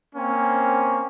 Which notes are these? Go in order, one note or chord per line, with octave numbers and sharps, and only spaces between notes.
A#3 C4 C#4